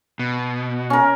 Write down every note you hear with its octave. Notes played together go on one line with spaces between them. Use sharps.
B2
C#4 A#4